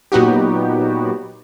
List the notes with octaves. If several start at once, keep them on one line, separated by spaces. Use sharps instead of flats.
A#2 F#3 B3 D#4 F#4 G4